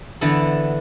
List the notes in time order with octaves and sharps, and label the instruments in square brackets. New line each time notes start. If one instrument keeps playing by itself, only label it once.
[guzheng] D3 E3 B3 A4